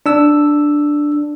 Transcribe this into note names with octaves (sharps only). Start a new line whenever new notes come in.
D4 E6